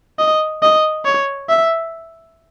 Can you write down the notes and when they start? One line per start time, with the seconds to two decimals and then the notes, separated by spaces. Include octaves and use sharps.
0.19 D#5
0.63 D#5
1.05 C#5
1.49 E5